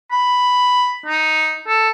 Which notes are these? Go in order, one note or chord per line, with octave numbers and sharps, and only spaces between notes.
B5
D#4
A4